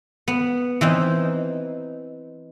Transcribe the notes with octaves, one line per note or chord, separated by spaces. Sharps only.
B3
E3 C4 D#4